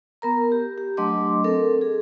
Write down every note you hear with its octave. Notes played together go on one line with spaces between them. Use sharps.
B3 A#4 A#5
G4
G4
F#3 A3 D4 D#5 C6 D6
C4 A4 A#4
G#4